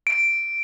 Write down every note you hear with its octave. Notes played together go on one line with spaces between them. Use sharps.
D7